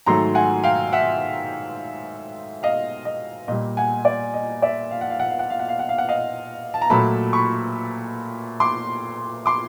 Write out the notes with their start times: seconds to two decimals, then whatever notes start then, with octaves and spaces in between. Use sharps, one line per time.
0.06 G#2 D#3 F#3 A3 A#5 C6
0.35 F#5 G#5
0.63 F5 G5
0.93 E5 F#5
2.63 D#5 F5
3.05 D#5
3.48 A#2 D#5
3.52 G3
3.77 F#5 G#5
4.05 D5
4.34 D#5
4.62 D5 E5
4.91 F5
5.01 F#5
5.10 F5
5.20 F#5
5.30 F5
5.39 F#5
5.50 F5
5.59 F#5
5.69 F5
5.79 F#5
5.89 F5
5.98 F#5
6.09 D#5 F5
6.74 A5
6.82 A#5
6.90 A#2 F#3 A3 A5 B5
7.33 B5 C#6
8.60 C6 D6
9.46 C6 D6